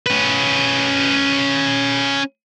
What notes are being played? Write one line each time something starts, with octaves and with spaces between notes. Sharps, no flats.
C#4 B4